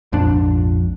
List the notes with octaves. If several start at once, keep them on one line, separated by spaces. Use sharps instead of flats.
A#1 F2 G#2 D4